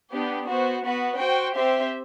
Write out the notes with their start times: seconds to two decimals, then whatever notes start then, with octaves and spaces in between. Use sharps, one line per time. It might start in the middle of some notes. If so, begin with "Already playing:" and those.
0.13 B3 D4 G4
0.49 B3 F#4 C5
0.84 B3 F#4 B4
1.19 F#4 C5 G5
1.55 C4 G4 C5 E5